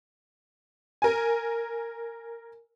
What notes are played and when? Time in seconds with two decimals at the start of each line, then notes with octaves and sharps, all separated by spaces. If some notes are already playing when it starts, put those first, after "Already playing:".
1.02 A#4 G#5